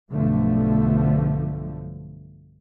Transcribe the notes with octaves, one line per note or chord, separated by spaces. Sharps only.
B1 G2 D3 F3 A3